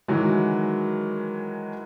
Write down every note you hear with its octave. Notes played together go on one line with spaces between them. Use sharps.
D#3 E3 F#3 G#3